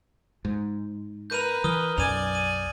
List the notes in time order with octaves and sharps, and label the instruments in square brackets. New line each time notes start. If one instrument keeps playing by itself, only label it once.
[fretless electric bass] G#2
[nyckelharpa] A#4 B4 [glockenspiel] G6 D#7 F7
[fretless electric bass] E3 [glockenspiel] D#6 F6 G7
[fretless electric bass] B1 F#2 [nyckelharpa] D5 G#5 [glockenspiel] D#7 F7
[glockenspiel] D#7